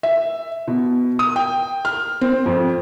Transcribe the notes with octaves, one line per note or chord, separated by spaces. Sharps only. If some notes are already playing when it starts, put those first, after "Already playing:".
E5
B2
D#6
G5
F6
C4
F2